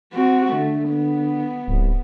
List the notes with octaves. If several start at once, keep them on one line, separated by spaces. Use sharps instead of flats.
C4 F#4
D3 A3
B3
D1 C2